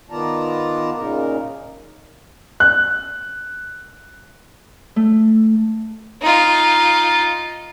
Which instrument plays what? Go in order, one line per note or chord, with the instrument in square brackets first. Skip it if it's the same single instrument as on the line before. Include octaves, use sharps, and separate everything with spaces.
[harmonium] D#3 B3 F4 D5 A5 A#5
A#2 C#3 D#4 A#4
[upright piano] F#6
[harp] A3
[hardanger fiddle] D#4 F4